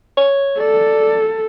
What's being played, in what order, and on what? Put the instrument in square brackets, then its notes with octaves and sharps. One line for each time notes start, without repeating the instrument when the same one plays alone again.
[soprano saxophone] C#5
[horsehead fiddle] A4 [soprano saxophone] D5